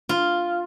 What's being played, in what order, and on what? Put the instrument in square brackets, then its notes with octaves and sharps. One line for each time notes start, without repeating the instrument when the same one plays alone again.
[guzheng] F4